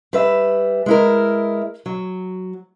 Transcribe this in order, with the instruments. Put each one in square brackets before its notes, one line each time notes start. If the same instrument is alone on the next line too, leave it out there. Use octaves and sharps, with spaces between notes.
[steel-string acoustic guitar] G3 B4 E5
G#3 E4 A#4
F#3